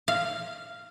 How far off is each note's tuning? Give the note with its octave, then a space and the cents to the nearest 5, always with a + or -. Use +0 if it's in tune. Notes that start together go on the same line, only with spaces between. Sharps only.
F5 -10